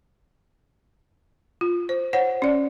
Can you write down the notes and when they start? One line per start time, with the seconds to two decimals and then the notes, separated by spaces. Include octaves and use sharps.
1.61 F4
1.89 C5
2.13 C5 C#5 F#5
2.42 C#4 D5